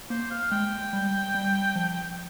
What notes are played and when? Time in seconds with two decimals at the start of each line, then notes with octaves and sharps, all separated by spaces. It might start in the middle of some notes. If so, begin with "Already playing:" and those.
0.10 A#3 C5
0.31 F5
0.51 G#3 G5
0.93 G3
1.35 G3
1.76 F3